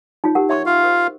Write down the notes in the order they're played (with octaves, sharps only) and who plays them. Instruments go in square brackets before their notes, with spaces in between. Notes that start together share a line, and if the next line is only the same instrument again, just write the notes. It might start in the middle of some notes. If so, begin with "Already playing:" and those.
[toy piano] D#4 F4 C#5
G4 A#4 F#5
[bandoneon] C#5 [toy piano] E5 C6 C#6
[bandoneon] F4 F5
[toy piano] A#4 C5